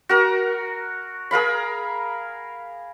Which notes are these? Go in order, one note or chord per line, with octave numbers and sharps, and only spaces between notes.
F#4 A#4
G#4 A#4 F5 B5